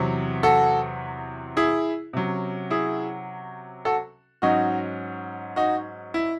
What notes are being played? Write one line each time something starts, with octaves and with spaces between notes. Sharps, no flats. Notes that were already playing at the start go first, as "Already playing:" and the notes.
Already playing: E2 C3 F#3 C4
F#4 A4
E4 G#4
C3 F#3 C#4
E4 G#4
F#4 A4
G#2 F#3 C#4 D#4 F#4
D#4 F#4
E4